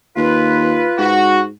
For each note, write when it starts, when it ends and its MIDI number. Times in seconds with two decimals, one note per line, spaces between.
0.17 0.86 39
0.17 1.11 65
0.17 1.11 71
0.98 1.50 44
0.98 1.40 66